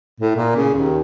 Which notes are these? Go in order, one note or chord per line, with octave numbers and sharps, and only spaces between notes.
A2
A#2
C#3
D#2